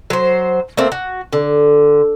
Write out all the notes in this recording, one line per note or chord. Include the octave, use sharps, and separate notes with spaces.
F#3 C5
A3 A#3 C4
F#4
D3